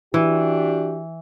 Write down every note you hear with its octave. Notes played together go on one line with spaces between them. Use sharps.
E3 D4 F#4 G4